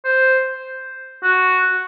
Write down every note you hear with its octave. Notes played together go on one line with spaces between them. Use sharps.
C5
F#4